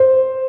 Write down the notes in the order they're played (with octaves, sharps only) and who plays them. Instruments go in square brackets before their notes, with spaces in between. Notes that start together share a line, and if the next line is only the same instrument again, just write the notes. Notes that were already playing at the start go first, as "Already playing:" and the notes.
Already playing: [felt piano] C5